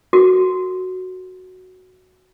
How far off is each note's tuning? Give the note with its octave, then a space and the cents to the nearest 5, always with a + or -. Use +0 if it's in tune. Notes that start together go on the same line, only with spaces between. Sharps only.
F#4 +0 A#4 -35